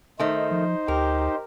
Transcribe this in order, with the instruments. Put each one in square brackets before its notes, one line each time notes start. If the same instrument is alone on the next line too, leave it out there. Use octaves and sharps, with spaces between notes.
[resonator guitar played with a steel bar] D#3 A3 [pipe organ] D#4 C5
[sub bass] F3
[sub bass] D2 [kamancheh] G4 [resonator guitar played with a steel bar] A#4